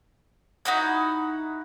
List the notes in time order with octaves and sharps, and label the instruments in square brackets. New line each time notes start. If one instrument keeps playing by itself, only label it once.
[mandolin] D#4 E4 F#4 G6